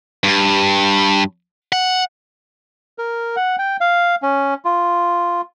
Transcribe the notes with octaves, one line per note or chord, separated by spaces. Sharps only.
G2
F#5
A#4
F#5
G5
F5
C#4
F4